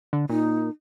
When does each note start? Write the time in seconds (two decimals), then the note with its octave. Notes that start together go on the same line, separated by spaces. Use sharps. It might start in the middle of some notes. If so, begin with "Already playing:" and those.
0.13 D3
0.29 A#2 D#4